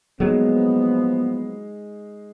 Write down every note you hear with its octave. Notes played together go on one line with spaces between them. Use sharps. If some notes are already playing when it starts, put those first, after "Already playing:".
F3 F#3 G#3 A#3 B3 D#4 G#4